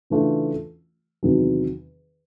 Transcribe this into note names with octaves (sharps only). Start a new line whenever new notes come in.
C#3 E3 A3 D4 F4
E2 C3 D#3 F#3